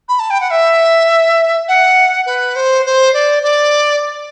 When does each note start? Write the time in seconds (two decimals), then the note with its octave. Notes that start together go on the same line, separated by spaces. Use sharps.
0.08 B5
0.19 A5
0.30 G5
0.40 F#5
0.50 E5
1.68 F#5
2.26 B4
2.55 C5
2.85 C5
3.13 D5
3.43 D5